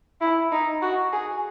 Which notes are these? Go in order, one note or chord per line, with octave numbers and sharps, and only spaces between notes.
E4
D#4
F#4
G#4